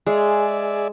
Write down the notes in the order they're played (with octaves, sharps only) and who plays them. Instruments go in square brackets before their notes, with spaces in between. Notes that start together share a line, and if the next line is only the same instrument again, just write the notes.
[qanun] G#3 [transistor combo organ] G#4 D5 E5